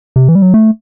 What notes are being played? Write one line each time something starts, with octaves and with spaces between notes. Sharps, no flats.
C3
E3
G3
F#3
A3